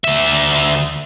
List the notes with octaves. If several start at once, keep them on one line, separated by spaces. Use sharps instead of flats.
D2 E5